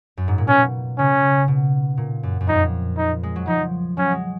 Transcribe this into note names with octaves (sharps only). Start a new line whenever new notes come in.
F#2
G#2
A#2
B2 C#4
C#3 C#4
B2
A#2
F#2
F#2
F2 D#4
D#4
G#3
F#3
F3 D#4
F#3 C#4
G#3